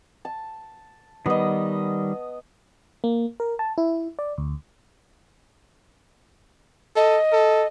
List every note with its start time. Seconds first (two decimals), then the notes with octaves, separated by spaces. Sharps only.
0.25 A5
1.26 D#3 G3 B3 D#5
3.04 A#3
3.40 A#4
3.59 A5
3.78 E4
4.19 D5
4.38 D2
6.96 A4 D#5
7.32 A4